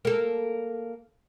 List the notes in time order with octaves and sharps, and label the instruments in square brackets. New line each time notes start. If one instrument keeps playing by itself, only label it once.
[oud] A#3 A4